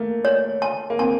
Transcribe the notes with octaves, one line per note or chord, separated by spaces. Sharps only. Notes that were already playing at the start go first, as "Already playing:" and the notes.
Already playing: A3 A#3
C#5
A5
A#3
C4 A5